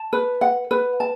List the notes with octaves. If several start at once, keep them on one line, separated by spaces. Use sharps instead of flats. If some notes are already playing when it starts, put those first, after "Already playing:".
Already playing: A5
B4
F#5
B4
A5